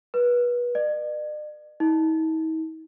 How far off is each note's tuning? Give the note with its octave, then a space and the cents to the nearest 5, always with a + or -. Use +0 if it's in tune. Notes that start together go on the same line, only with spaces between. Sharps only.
B4 -30
D5 +45
D#4 +45